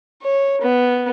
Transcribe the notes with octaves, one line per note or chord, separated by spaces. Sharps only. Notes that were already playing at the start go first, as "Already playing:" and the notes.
C#5
B3